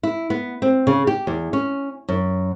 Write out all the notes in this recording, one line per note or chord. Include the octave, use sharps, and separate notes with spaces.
E4
B3
C4
C#3
G4
E2
C#4
F#2